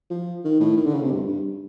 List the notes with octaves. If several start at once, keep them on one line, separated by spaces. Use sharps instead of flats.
F3
D#3
A2
D#3
D3
C#3
C3
G2
G2